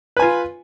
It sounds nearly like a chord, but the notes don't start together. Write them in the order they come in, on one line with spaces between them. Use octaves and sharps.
B4 G#5 F4